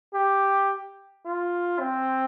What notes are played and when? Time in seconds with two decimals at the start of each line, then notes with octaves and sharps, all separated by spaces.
0.14 G4
1.25 F4
1.80 C4